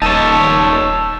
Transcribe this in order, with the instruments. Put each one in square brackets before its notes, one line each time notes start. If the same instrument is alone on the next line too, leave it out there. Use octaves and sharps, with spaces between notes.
[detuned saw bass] D#1 [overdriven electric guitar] D#4 C#5 [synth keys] A5 [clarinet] E6